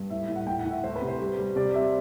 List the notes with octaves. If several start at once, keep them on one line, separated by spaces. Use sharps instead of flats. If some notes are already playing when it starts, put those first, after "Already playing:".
Already playing: G2
A2 E5
A2
F#5
A2 G5
F#5
A2
E5
A3 C5
B4
C3
C5
G3
G3
C3 D5
C4 E5